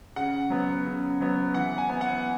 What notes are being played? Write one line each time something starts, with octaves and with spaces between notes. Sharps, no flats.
C#3 F#5
F#3 B3
C#3
F#3 B3
E3 F#5
G#5
B3
F#5